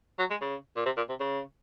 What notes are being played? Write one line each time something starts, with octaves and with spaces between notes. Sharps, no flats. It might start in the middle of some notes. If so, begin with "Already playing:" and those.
F#3
G#3
C#3
A#2
C3
A#2
C3
C#3